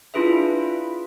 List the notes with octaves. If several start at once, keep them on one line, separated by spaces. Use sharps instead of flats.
D4 E4 F4 G#4 B4 E5